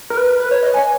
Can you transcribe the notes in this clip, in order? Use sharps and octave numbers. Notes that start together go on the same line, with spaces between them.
A#4
B4
B4
C#5
D#5
G#5